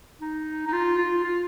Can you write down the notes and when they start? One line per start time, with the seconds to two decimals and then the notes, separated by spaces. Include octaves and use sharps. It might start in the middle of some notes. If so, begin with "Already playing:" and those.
0.21 D#4
0.67 D#4
0.73 F4
0.98 F4
1.24 F4